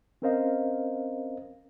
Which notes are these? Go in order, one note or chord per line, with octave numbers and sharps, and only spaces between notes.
C4 C#4 A#4 C5 D#5 F5